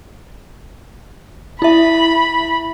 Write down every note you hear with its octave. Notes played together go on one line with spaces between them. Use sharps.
E4 E5 B5